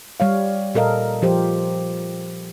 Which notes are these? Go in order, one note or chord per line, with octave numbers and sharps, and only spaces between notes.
G3 C#5 F5
A#2 A4 A#4 D#5 F5
F3 G4 C5